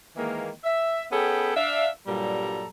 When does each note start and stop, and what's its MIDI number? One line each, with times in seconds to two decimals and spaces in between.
0.16 0.50 51
0.16 0.50 52
0.16 0.50 56
0.16 0.50 58
0.64 1.05 76
1.12 1.52 59
1.12 1.52 61
1.12 1.52 68
1.12 1.52 69
1.12 1.52 79
1.12 1.52 83
1.56 1.89 62
1.56 1.89 76
1.56 1.89 77
2.07 2.66 43
2.07 2.66 46
2.07 2.66 54
2.07 2.66 55
2.07 2.66 69
2.07 2.66 82